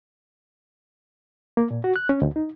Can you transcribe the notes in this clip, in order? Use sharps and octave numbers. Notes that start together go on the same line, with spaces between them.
A#3
A#2
F#4
F#6
C#4
D2
D#4